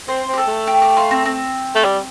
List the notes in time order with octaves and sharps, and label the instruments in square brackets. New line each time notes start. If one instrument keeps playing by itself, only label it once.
[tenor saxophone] C4 [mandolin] C5
[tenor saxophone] C4 [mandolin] G4
[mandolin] A4
[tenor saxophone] A3
[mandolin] G4
G4
F4
C4
C4
[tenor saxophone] A3
G3